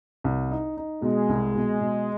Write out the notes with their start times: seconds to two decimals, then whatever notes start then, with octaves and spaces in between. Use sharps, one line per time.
0.24 C2
0.51 D#4
0.77 D#4
1.02 B2 G#3
1.29 C2
1.55 B2
1.81 B2